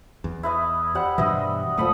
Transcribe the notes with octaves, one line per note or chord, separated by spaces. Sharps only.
E2
E4 B4 D#5
G3 C5 F#5
G2 B2 E3 B4 D#5 E5
D#1 F3 A3 B5 D#6